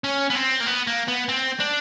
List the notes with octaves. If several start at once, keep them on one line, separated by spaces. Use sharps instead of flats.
C#4
B3
C4
A#3
B3
A#3
B3
C4
D4